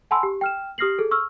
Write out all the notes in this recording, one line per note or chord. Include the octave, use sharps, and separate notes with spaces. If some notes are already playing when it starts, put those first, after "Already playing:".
F#5 G#5 A5 B5 C6 E6
G4
G5 F6 E7
G4 D#6 F6 A#6 C7 F#7
G#4 A4
C#6 E6 F6